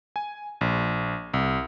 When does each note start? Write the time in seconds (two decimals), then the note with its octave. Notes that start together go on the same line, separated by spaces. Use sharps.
0.16 G#5
0.61 A#1
1.34 C2